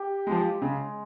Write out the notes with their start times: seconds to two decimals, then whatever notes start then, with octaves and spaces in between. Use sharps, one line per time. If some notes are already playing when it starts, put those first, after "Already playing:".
Already playing: G4
0.27 F3 G#3
0.61 C#3 G#3